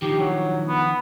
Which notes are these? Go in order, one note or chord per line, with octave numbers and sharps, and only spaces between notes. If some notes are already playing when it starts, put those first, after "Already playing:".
D#3 F3 G4
F#3
B3